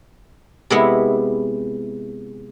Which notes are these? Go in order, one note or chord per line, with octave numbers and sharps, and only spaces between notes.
C3 G#3 B3 E4